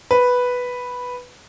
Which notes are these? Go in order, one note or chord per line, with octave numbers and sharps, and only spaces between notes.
B4